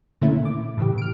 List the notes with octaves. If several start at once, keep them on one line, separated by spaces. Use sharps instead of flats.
A#2 D3 D#3 A3 C#4 E4
D6
A2 C#3 E3 G4
F6 D7